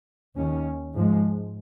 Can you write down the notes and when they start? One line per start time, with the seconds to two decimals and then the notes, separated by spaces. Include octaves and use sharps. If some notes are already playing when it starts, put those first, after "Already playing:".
0.37 D#2 D#3 C#4
0.94 G#2 F3 G#3